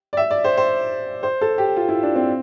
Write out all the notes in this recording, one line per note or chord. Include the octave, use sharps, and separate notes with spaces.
D5
E5
D5
C5
C5
C5
A4
G4
F4
E4
D4
C4